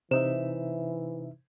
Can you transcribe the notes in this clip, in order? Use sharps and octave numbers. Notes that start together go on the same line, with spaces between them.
C3 E3 D#4 C5 E5 E7